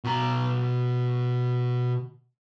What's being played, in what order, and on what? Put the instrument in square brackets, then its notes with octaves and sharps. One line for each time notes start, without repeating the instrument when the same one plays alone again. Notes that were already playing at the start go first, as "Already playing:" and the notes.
[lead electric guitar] B2 A#5